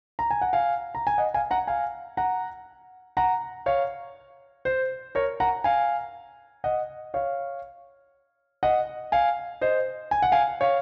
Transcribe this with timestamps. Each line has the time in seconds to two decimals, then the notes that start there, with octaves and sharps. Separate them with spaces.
0.19 A#5
0.31 G#5
0.41 F#5
0.53 F5 G#5
0.95 A#5
1.07 G#5
1.18 D#5 F#5
1.34 F5 G#5
1.51 F#5 A#5
1.67 F5 G#5
2.17 F#5 A#5
3.17 F#5 A#5
3.66 C#5 F5
4.65 C5
5.15 A#4 C#5
5.40 F#5 A#5
5.64 F5 G#5
6.64 D#5 F#5
7.14 C#5 F5
8.63 D#5 F#5
9.12 F5 G#5
9.61 C5 D#5
10.11 G#5
10.22 F#5
10.32 F5 G#5
10.61 C#5 F5